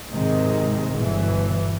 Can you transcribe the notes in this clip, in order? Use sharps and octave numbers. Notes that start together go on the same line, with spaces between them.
G#2 C3 D#3 G#3
G1 B2 E3